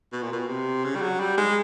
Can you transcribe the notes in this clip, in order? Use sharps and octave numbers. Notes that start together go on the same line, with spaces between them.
B2
A#2
B2
C3
C#3
G3
F#3
G3
G#3